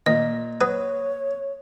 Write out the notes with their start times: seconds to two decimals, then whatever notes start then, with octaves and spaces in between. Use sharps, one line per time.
0.06 A#2 D#3 D#5
0.61 F#3 B4 C#5 D#6